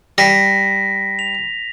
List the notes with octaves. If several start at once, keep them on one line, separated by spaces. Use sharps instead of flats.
G3 A#6 B6
F7